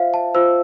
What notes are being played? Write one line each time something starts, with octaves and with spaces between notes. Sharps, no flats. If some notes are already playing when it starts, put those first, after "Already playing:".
Already playing: F4 C5 E5 F5
A5
F4 C5 E6